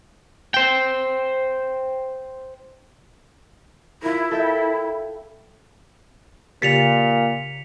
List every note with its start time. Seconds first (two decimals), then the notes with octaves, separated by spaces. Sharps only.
0.54 C5 G5
4.02 E4 F4 A#4
4.31 A4 E5 G5
6.62 A#2 C#3 G4 A6 B6 C#7 F7